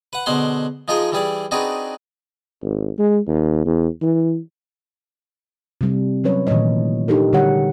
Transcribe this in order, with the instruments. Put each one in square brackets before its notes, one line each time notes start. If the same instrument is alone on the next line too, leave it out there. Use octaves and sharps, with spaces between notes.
[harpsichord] B4 F#5
B2 D3 G#3 C5 F#5 C6
F3 G#3 D#4 F4 G#4 A#4
E3 G3 G#4 D5
C4 D4 D#4 F#4 G#4 B4
[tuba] G#1
G#3
D#2
E2
E3
[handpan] C3 G3
F#3 C#4 B4 C#5
A#2 D#3 E3 A3 C#5 D#5
D4 D#4 G4 A4 A#4
D3 G3 G4 C#5 F#5